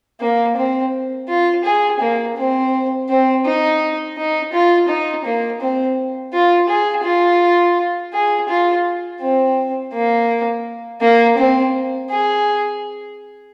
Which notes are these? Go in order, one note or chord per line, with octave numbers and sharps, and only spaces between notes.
A#3
C4
F4
G#4
A#3
C4
C4
D#4
D#4
F4
D#4
A#3
C4
F4
G#4
F4
G#4
F4
C4
A#3
A#3
C4
G#4